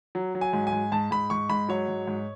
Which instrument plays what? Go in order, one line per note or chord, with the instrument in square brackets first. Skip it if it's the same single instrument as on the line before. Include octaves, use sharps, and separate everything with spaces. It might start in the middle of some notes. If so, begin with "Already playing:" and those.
[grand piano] F#3
F#3
G#5
G#2
G#5
G#2
G#2 A5
G#2 B5
G#2 C#6
G#2 B5
F#3 C#5
G#2
G#2